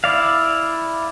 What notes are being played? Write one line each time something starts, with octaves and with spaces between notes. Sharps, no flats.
E4 D5 F5